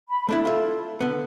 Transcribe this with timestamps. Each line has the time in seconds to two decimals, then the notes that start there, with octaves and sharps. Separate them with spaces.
0.09 B5
0.29 A3 D4 E4 A4
0.45 F4 E5
1.01 D3 B3